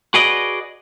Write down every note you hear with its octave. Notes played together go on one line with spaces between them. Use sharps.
F#4 G#4 B4 D5 D#5